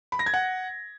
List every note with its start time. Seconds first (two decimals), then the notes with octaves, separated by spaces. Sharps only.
0.12 B5
0.19 A#6
0.26 G#6
0.34 F#5